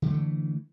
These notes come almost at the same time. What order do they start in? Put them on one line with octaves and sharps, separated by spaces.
D3 F3 A3 E3